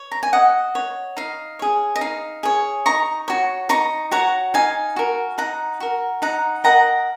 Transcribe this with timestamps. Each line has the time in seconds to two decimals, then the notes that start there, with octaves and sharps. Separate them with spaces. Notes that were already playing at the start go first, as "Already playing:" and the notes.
Already playing: C#5
0.11 A#5
0.23 G#5
0.33 F#4 D#5 F#5
0.75 C#5
1.17 D#4 F5
1.59 G#4 C#5
1.96 D#5
2.01 D#4 F5
2.43 G#4 C#5
2.86 D#4 A#5 C#6
3.28 F#4 C#5
3.69 D#4 A#5 C#6
4.11 F#4 C#5 F#5 A#5
4.54 D#4 F5 G#5
4.96 F#4 A#4
5.38 D#4 F#5 A#5
5.80 F#4 A#4
6.22 D#4 F#5 A#5
6.64 A#4 D#5 F#5 A#5